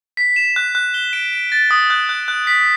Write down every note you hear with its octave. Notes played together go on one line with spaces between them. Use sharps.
B6
E7
F#6
F#6
G7
D7
D7
A6
D#6
F#6
F#6
F#6
B6